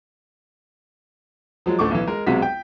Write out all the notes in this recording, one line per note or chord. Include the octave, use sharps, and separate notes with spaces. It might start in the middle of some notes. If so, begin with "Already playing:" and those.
F3 F#3 G#3
A1 D2 A3 C#6 D6
B1 E3
G#3 A#4
B1 C3 G#3 F#4 B6
G5